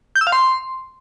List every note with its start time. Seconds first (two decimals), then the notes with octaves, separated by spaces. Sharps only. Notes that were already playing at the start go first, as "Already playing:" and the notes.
0.16 G6
0.21 E6
0.27 F5
0.32 C6